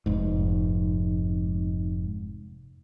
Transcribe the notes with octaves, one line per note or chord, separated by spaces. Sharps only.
F1 G#2